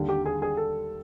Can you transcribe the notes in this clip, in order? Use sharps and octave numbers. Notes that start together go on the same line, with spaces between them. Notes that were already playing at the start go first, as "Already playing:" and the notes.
Already playing: D#2 D3 G3
G4
G#4
G#4
A4